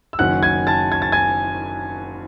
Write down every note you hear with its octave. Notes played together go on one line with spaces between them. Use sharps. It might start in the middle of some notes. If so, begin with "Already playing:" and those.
E6
F#1 F#2 D#3 F#3 C#4 F#5 F#6
G#5 G#6
A5 A6
G#6
A6
G#5 G#6